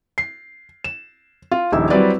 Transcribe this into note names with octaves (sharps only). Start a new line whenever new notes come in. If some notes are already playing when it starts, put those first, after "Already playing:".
C7
E7
F4
D#1 A#1 D#4 E4 E6
F#3 G3 C4 E4 B4 D5